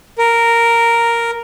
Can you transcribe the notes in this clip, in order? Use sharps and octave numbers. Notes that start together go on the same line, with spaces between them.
A#4